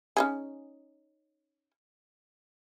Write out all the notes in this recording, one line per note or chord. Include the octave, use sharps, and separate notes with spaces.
C#4 D#4 G#4